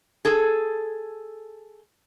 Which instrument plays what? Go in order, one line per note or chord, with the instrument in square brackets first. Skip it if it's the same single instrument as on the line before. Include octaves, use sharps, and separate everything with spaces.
[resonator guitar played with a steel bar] G#4 A4